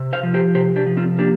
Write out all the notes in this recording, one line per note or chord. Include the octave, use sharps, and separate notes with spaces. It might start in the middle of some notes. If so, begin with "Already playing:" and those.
Already playing: C3
C5 F5
F3
G4 C5
C3 G4 C5
D4 G4
F3
C4 F4
A#3 D4 G4